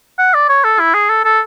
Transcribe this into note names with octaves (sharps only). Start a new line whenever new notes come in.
F#5
D5
C#5
A4
E4
G#4
A4
A4